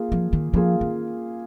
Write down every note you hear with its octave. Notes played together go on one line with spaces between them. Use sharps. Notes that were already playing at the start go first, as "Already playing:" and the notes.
Already playing: A#3 F4 G#4
F3
D#3
F3 A#3 F4 G#4
D#3